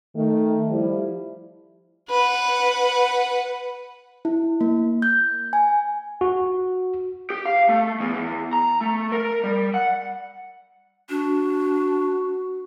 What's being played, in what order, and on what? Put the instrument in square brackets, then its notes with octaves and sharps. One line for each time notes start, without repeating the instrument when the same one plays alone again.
[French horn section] D#3 A3
F3 G3 E4
[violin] B4 F#5
[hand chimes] E4
A#3
G6
G#5
[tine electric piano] F#4
[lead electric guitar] G4
F5
A3
E2
E2
A#5
A3
A#4
G3
F#5
[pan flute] D4 [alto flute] F#4